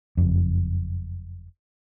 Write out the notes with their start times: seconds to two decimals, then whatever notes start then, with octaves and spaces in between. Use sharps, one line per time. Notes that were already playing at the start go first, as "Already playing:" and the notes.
0.17 F#1 F2